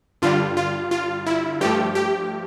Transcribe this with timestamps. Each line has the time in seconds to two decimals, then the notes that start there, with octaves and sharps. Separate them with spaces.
0.22 G2 D3 G3 F4
0.57 F4
0.91 F4
1.26 E4
1.61 G2 F3 A3 G4
1.95 G4